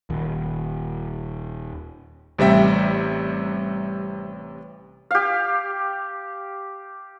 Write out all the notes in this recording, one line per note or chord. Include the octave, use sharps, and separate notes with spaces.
D#1 D#2
A1 C3 G3 E5 G5
G4 F5